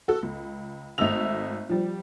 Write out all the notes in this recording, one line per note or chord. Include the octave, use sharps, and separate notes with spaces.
F#4 A4
C#2
G#1 A3 D#5 E5 E6 F7
F3 G3